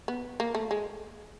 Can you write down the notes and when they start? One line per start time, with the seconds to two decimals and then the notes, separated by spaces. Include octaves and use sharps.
0.08 B3
0.40 A#3
0.55 A3
0.71 G#3